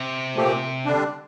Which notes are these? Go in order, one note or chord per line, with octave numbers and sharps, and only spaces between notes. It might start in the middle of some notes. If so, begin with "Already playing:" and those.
Already playing: C3
A#2 F3 A3 C4 G4
D3 G3 D4